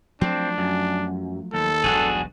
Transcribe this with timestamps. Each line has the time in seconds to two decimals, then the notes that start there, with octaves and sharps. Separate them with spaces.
0.21 F3 F#3 A3 C4 D4
0.58 F#2
1.54 D#2 A4
1.84 E1 B1 G2 D4 F#4 G#4